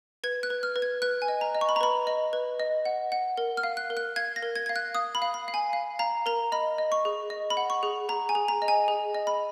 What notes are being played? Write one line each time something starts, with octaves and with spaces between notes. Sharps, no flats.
B4 G#6
F#6
B4
F6
B4
G#6
B4 F#6
G#5
D#5
A#5
D#5
C#6
B5
A#5
B4 B5
D#5
B4
D#5
F#5
F#5
A#4
F6
F5
F#6
A#4
F#6
F5 G#6
A#6
A#4
G#6
F5 G#6
F#6
F5 D#6
B5
F5
B5
F5
G#5
F5
F5 A#5
A#4 A#5
D#5 B5
D#5
C#6
G#4
D#5
B5
F#5
C#6
G#4
G#4 A#5
G#5
G#4
A#5
D#5
G#5
G#4
D#5
B5